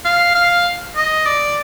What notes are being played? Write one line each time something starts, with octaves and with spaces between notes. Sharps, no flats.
F5
F5
D#5
D5